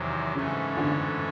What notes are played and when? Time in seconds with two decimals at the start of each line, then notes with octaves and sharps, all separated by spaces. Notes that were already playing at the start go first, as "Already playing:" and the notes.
Already playing: E2 C3 D#3 F#3
0.35 G#2 C#3 E3 A3 C#4
0.77 D3